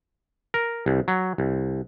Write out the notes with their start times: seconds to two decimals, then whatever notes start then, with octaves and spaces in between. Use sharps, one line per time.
0.54 A#4
0.86 C2
1.08 F#3
1.38 C2